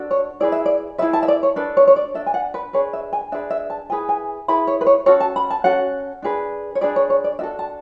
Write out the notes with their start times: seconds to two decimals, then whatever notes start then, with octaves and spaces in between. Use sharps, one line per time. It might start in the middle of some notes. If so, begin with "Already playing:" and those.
Already playing: D4 F#4 A4
0.11 C#5
0.40 E4 G#4 B4 D5
0.52 E5
0.66 D5
0.98 E4 G#4 B4 E5
1.13 A5
1.23 E5
1.28 D5
1.43 C#5
1.56 D4 A4 B4
1.77 C#5
1.87 C#5
1.96 D5
2.14 D4 A4 E5
2.26 G#5
2.34 F#5
2.54 B4
2.73 D4 G#4 B4 C#5
2.93 E5
3.13 G#5
3.32 D4 G#4 B4 E5
3.50 E5
3.70 A5
3.90 E4 G#4 B4 G#5
4.09 G#5
4.48 E4 G#4 B4 B5
4.67 C#5
4.81 B4
4.86 C#5
5.06 C#4 F#4 A4 C#5
5.20 A5
5.36 B5
5.50 A5
5.64 C#4 F#4 A4 F#5
6.22 D4 G#4 B4
6.75 C#5
6.81 D4 G#4 B4 D5
6.96 C#5
7.10 C#5
7.24 D5
7.39 D4 F#4 A4 E5
7.59 A5